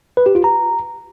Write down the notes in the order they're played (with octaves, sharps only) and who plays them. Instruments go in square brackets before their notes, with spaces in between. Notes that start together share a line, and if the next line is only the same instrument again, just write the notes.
[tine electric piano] B4
G4
F4
A#5